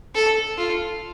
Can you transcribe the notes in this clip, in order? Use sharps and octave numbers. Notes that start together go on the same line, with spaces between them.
A4
F4